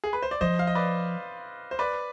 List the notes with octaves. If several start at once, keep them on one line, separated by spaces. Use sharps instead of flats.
G#4
B4
C5
D5
F3 C5 D#5
F5
D#5
B4 D5
C5
B4 D5